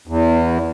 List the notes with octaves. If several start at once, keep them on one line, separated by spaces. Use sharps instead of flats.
E2